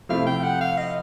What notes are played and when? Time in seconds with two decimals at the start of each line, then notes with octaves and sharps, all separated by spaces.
0.09 C3 F3 A3 C4 E4 F5
0.26 G5
0.44 F#5
0.61 F5
0.78 D#5